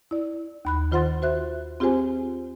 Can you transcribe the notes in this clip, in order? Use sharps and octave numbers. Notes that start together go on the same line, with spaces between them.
E4 D5
D#2 B5 F#6
D#3 F4 C5 F#5 C6 A6
F#4 C5 E5 F#6
C4 F4 G4 G#4 C5 G#5